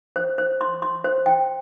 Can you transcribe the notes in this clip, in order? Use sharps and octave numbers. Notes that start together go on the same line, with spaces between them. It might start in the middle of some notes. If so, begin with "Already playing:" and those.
C5
C5
C6
C6
C5
G5